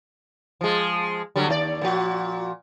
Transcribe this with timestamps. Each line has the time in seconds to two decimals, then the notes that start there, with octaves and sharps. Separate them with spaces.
0.61 F3 G#3
1.36 D3 F#3 G3
1.48 D#2 D#4 D5
1.81 A#2 F3 F#4